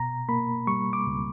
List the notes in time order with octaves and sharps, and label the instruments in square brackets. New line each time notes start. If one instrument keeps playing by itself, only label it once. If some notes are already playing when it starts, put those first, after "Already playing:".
Already playing: [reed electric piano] B2 A#5
A#3 B5
G3 C#6
D6
C#2